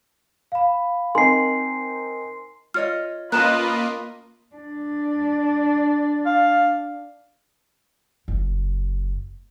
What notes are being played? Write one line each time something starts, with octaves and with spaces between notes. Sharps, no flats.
F5 B5
C4 D#4 A#4 G#5 C6 C7
F4 C#5 D#5 F6
A#3 C#4 F4 B4 D#5 A5 A#5 F#6
D4
F5
F#1